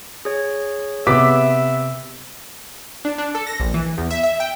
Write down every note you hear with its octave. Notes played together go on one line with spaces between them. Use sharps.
G#4 C#5
C3 B3 E5 D6 B6
D4
D4
A4
A#6
A#1
E3
E2
E5
E5
G5